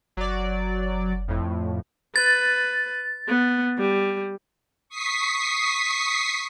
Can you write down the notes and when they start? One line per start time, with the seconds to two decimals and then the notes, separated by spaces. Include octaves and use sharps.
0.17 F#1 F#3 D5
1.28 F2 A2
2.16 B4 A6
3.28 B3
3.78 G3
4.89 C#6 D#6 B6 C7